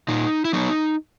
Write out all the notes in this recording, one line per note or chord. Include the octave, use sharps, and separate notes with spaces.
A#2 D#4
E4
F#3 B3 D#4